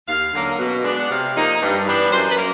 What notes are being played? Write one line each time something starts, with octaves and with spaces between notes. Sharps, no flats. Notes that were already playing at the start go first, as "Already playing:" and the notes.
D#2 F5
D3 F#3 A#3 C#4
B2
G#3 B3 D4
F#5
C3 F5
F3 A#3 D#4
G2
E3 G3 B3 D4
F#2 C5
B4
A#3